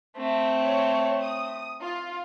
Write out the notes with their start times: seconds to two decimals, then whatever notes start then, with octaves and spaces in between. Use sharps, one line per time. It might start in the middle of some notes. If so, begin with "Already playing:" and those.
0.16 A3 C4
0.62 C#5
1.23 D#6
1.82 F4